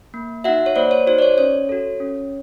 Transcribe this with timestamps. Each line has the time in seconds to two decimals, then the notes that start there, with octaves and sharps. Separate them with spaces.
0.14 A#3
0.44 D#4 F#4 E5 F#5
0.66 C#5
0.76 A#3 C5 D5
0.91 C#5
1.07 D#4 F#4 C5
1.19 D5
1.22 C#5
1.38 C#4 C#5
1.69 F#4 A4
2.00 C#4